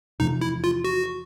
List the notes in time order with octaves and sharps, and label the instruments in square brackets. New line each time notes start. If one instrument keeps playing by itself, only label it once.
[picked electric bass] E2 C3 F3 A3 [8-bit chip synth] D#4
[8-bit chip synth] E4
F4
F#4